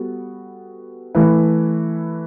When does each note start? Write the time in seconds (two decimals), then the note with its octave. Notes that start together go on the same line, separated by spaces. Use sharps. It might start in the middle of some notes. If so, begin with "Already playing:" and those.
Already playing: G3 B3 F#4 A4
1.15 E3 A3 E4 B4